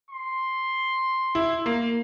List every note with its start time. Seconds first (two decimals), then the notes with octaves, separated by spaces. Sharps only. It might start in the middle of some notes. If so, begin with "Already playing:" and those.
0.11 C6
1.35 E4
1.66 A#3